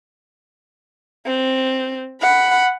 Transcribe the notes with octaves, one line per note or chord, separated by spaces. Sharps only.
C4
F#5 B5